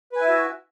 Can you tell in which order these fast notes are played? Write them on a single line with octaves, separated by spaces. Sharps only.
B4 G#5 E4 E5 F#4